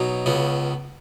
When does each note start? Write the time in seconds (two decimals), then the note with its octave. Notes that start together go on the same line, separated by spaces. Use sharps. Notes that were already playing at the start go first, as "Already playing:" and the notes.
Already playing: B2 F#3 D#4
0.26 C#2 C#3 B3